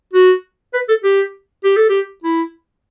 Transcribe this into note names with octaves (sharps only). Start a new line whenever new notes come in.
F#4
B4
A4
G4
G4
A4
G4
E4